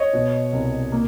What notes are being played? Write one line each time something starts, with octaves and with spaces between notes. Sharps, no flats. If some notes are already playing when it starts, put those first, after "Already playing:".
Already playing: C#5 D#5
B2
C2
A#3